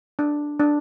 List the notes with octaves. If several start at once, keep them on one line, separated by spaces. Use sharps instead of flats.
D4
D4